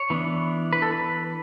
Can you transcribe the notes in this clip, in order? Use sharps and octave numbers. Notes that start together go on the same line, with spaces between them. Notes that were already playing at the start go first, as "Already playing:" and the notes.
Already playing: C#5
E3 B3 D4
B4
A4
B4